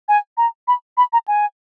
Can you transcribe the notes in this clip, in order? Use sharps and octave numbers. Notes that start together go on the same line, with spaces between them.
G#5
A#5
B5
B5
A#5
G#5